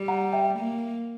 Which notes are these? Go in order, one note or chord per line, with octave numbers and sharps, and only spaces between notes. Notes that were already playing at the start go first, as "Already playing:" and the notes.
Already playing: G3
F#5 A#5
E5 G5
A#3